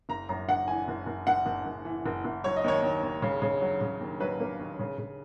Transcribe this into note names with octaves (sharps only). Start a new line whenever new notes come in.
F#1 A#5
F#2 A#5
F#1 F#5
E3 G#5
F#1
F#1
F#1 F#5
F#1
F#1
E3
F#1
F#1
F#3 C#5
D#5
D#2 C#5
D#2
D#2
C#3
C#3
F#3
C#3
D#2
F#3 B4
A#3
D#2
C#3
C#3